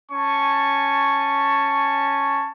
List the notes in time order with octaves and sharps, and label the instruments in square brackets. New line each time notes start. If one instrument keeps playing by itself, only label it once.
[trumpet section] C#4 G#5 A5 C#6